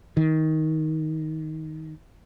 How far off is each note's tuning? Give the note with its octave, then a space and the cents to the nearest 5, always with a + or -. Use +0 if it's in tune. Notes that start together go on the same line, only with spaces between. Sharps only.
D#3 +15